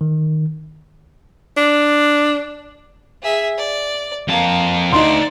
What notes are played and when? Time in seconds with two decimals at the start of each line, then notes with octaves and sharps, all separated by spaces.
0.01 D#3
1.57 D4
3.22 G#4 E5
3.58 D5
4.28 F2 A#3 A5
4.92 D2 D4 D#4 D5 C6